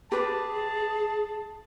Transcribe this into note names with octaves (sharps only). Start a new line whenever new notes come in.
G4 G#4 B4 A5